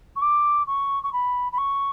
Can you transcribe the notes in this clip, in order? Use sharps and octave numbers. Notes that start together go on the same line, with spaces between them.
C#6
D6
C#6
C#6
B5
B5
C#6